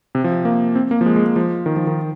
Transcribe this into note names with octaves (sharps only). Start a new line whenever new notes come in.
C3
F3
A#3
C4
A#3
F3
G#3
G#3
G#3
F3
D#3
F3
D#3